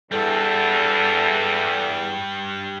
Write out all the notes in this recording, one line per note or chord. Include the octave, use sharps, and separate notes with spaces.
E2 G2 G3 A4